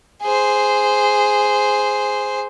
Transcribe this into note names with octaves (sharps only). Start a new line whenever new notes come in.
G#4 C5